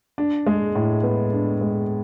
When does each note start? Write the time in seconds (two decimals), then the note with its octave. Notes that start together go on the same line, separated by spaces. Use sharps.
0.18 D4
0.46 G#3
0.75 A2
1.03 B3
1.33 D4
1.61 G#3